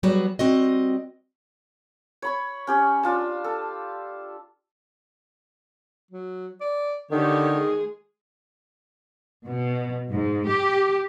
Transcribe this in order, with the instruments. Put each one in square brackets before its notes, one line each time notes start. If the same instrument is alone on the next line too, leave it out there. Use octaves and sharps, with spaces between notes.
[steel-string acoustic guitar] F#3 G3 B3 F#4 G#4
G3 C4 F#4 D#5
[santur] C#5 B5 C#6
C#4 G4 C#5
D4 F4 A5
A4
[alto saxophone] F#3
D5
[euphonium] D3 [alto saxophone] D#3 [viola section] G4 A4 C#5
[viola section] G#3 G#4
[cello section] B2
G#2
G4